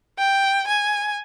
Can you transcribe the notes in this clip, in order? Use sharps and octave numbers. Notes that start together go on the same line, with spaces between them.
G5
G#5